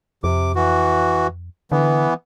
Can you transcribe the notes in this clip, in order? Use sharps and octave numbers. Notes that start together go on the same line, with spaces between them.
F2 C3 D6
E3 F#4
D3 E3 B3